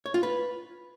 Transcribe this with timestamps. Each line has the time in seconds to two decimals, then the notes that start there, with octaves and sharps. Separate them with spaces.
0.06 C#5
0.14 F4
0.23 B4